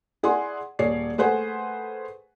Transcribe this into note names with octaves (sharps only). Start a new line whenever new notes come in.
E4 G#4 D5 F#5 G#5 C6
D#1 G#4 C#5 D5 C7
A3 G#4 B4 C5 F#5 G#5